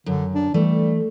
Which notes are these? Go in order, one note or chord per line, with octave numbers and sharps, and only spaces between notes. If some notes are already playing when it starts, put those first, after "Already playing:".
F#2 D3
D4
E3 G3 A3